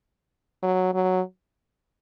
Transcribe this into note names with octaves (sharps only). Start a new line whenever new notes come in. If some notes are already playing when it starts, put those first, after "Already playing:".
F#3
F#3